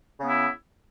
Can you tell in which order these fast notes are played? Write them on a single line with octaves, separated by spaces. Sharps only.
C#3 B3 E4